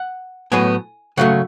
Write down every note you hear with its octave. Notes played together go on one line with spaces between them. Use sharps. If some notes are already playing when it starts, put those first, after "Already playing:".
Already playing: F#5
A2 F#3 B3 G#5
C#3 F#3 A3 F#5